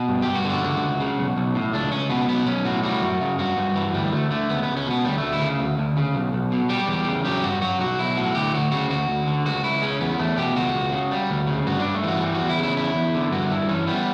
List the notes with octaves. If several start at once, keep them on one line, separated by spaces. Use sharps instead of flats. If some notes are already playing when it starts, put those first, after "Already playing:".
Already playing: B2
G2
G2 G4
F#4
D3
F#4
C#2
C#2
C#3
B1
B1
A2
C#2 D4
C#2 C#4
B2 B3
B1 B3
B1 C#4
A2 F#4
G3 F#4
F#2
C#3
G2 F#4
G2
E3
D2 G3
D2 A3
D3 A3
C#2 B3
C#2 B3
C#4
B2 B3
D2 G3
D2 A3
E4
C#3
D2
D2
C#3
B1
B1
B2
G3 G4
E2
C#3
F#3 G4
G2 F#4
F#3 F#4
B1 F#4
B1 E4
A2 F#4
D2 G4
D2 F#4
C#3 F#4
D2 F#4
D2
D3
C#2 F#4
C#2 E4
C#3 C#4
E2 B3
E2 A3
B2 G4
C#2 F#4
C#2
C#3
G3
D2
C#3
G2 F#4
G2 D4
A3
E3 F#4
G3
E2 F#4
E4
C#3
E4
E2 E4
E2
D3
G2 F#4
G2 E4
E3 C#4
G3 B3